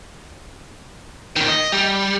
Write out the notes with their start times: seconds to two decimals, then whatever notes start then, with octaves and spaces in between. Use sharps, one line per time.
1.36 A#2 D#3
1.48 D#5
1.72 G3